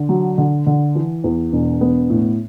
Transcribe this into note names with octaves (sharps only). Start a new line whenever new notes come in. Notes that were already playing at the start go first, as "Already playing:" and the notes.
Already playing: D3
F#3
D3
D3
E3
E2
E1
B3
A2